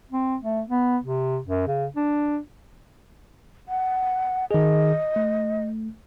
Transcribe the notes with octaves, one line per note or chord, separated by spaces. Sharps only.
C4
A3
B3
C3
F#2
C#3
D4
F#5
D#3 G#4 D#5
A3